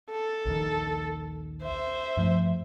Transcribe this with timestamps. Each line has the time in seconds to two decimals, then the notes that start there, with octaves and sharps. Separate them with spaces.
0.10 A4
0.45 A#1 D#2 D#3
1.62 C5 E5
2.17 G2 F3 A3